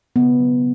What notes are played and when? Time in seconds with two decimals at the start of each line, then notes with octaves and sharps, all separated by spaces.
0.16 C#3 B3
0.39 F#3